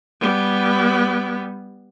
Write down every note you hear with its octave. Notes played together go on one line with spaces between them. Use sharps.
G3 B3